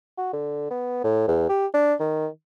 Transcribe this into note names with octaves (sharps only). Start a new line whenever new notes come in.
F#4
D3
B3
A2
E2
G4
D4
D#3